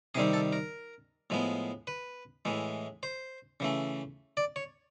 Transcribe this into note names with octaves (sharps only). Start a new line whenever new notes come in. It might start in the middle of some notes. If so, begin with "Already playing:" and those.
C3 D#3 G3 C4 G#4
A4
A#4
A2 F3 G#3 B3
B4
A2 E3 G#3
C5
C#3 E3 A3
D5
C#5